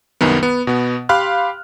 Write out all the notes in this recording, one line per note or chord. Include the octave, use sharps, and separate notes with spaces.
C2 F#2 D#3 B3
B3
B2 B3
G4 F5 B5 C6 F6 F#6